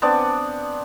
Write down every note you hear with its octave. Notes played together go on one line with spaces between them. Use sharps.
B3 C4 D4 D5